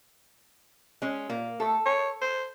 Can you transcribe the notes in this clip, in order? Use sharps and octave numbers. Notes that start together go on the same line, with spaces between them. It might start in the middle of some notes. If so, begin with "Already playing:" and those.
G#3 C#4
A#2 A#3
A3 A4
C#5
C5